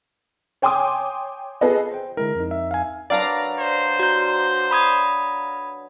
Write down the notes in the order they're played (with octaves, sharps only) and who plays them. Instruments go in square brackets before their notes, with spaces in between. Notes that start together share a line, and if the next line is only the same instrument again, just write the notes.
[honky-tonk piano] C#5 G5 G#5 C6 D6 D#6
B3 F4 G#4 A4 B4 D#5
[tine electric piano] C5 G5
[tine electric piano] D3 G#3 E4 [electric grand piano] A#4
[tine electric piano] F2 D#4
[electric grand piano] E5
F5 G#5
[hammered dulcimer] F#3 D4 B4 [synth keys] D5 F5 A#5
[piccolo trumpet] C5
[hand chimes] F#4 G6
B5 D#6 G#6